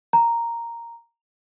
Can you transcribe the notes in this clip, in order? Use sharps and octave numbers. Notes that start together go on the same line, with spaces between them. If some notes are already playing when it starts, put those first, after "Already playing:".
A#5